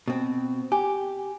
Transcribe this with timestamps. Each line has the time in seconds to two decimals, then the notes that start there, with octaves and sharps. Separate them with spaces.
0.08 B2 C4
0.72 G4 G#5